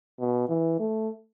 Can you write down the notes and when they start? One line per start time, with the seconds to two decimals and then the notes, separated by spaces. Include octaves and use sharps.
0.20 B2
0.49 E3
0.80 A3